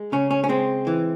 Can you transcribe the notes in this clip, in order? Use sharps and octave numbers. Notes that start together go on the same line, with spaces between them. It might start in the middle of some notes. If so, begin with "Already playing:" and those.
Already playing: G#3
C#3 C#4
C#4
C#4
G#3 C4
E3